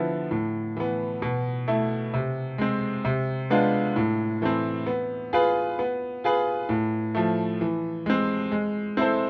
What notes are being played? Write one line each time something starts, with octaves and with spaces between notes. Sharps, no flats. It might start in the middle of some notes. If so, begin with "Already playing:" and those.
Already playing: D3 F3 B3 E4
A2
E3 B3
B2
A3 E4
C3
G#3 C4
C3
G#3 B3 D4 F4
A2
E3 A3 C4
B3
F4 G#4 B4
B3
F4 G#4 B4
A2
F3 A3
E3
G#3 C4
G#3
C4 E4 A4 C5